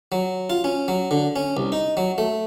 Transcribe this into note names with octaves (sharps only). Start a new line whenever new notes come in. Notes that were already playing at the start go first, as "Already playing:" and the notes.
F#3
F4
C#4
F#3
D3
C#4
C2
D#4
F#3
A3